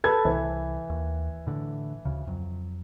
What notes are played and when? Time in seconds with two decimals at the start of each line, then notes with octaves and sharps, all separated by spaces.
0.04 A4 B4 G#6
0.25 C2 E3
0.90 D#2
1.47 A2 D3
2.05 D2 C#3
2.27 F2 F#3